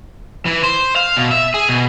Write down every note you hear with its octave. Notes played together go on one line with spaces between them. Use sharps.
E3
C5
F5
B2
E5
G#4
B2